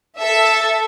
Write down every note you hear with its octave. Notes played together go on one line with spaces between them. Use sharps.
A4 E5